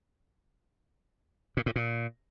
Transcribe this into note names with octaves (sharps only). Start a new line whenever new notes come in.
A#2
A2
A#2